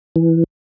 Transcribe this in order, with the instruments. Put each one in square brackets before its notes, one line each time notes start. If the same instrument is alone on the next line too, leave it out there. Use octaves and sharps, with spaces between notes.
[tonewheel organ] E3